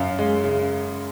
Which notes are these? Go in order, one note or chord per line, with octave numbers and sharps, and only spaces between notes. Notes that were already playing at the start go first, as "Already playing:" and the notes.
Already playing: F#2 F5
G#3
C#3